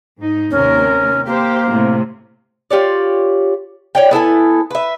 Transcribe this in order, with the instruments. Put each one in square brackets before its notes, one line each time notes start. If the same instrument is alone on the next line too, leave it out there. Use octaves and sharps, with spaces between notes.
[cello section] G#2 D#4
[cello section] D#2 C3 A#4 [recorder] C#4
[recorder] A#3 [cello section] G4 C5
[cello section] A2 C3
[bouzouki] F4 G4 C#5 D5
C#5 D5 G5
B3 E4 A4 G#5
B4 E5